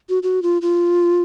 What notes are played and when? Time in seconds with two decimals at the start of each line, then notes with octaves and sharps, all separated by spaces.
0.09 F#4
0.23 F#4
0.43 F4
0.62 F4